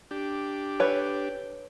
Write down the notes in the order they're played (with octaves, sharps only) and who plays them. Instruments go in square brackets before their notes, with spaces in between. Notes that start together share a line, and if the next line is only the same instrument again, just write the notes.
[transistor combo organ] D4 G4
[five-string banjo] A4 B4 C#5